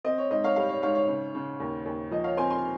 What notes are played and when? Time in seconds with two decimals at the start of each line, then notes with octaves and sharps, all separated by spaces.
0.05 C4 D#5
0.18 C#5
0.30 G#2 D#5
0.44 C#5 F5
0.56 G3 C#5 F5
0.69 C#5
0.82 G#2 C#5 F5
0.95 C#5
1.08 C#3
1.35 C#3
1.60 D#2
1.86 D#2
2.11 F3 D#5
2.24 C#5 F5
2.37 C4 G#5 C6
2.50 G#5 C6